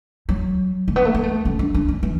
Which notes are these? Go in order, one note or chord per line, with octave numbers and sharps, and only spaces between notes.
F#3
A3
B3
A3
B3
A3
C#4
D4
D4
C#4
E3